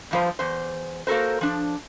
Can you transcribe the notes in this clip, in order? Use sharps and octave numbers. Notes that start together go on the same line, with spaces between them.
G2 F3 C5
E2 C5
A#3 F#4 A4 A#4 C5
F3 D4